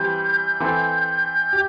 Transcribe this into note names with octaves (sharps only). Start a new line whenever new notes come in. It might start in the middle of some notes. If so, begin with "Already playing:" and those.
Already playing: E3 G3 C4 G6
E3 C4 A4
G4